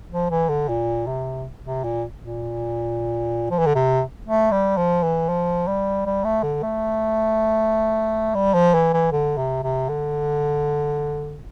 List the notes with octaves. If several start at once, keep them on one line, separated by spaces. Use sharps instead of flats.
F3
E3
D3
A#2
C3
C3
A#2
A#2
F3
E3
D3
C3
A3
G3
F3
E3
F3
G3
G3
A3
D3
A3
G3
F3
E3
E3
D3
C3
C3
D3